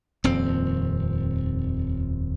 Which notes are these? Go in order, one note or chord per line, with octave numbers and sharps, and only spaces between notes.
D#1 F2 C4